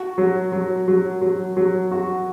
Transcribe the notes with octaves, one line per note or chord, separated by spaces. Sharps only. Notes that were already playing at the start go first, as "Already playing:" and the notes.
Already playing: F#4
F#3
F#3
F#3
F#3
F#3
F#4